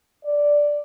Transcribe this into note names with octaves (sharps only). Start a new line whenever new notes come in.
D5